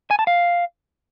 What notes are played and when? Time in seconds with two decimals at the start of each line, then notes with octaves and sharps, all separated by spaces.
0.11 G#5
0.19 A5
0.27 F5